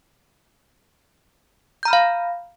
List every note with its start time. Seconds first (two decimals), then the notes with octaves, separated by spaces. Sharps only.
1.83 G6
1.85 A#5
1.88 F6
1.90 B5
1.93 F5